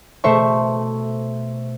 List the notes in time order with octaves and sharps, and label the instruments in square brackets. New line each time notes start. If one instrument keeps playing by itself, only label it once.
[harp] B2 A3 C5 E5 C#6